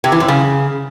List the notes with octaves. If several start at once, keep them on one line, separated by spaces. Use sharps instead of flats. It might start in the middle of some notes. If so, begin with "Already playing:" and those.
C3
E3
F#2
C#3